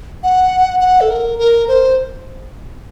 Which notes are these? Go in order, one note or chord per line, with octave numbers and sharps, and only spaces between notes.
F#5
F#5
A4
A#4
A#4
C5